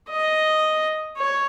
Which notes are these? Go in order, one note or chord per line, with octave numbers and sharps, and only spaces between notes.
D#5
C#5